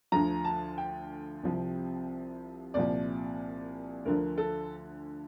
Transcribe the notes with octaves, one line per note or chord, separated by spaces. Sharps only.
D2 D3 F3 A#5
A5
G5
C2 C3 F3
C2 A#2 F3 D5
D2 D3 F3 A#4
A4